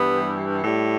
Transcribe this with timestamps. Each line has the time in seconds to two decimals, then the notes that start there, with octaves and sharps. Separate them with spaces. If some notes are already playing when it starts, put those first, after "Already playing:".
Already playing: G2 E3 G3 B3
0.64 A2 G3